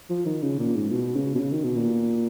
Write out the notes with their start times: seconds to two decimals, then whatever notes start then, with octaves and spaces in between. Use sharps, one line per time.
0.10 F3
0.26 D#3
0.42 C#3
0.59 A#2
0.75 G#2
0.91 B2
1.16 C#3
1.35 B2
1.40 C#3
1.52 D#3
1.64 B2
1.77 A#2